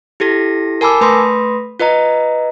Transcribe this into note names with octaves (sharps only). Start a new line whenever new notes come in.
E4 G4 A4 A#6
A#4 G#5 A5 B5 D6 E6
A3 B4 B5 C6 D#6 A#6
F4 B4 D#5 A#5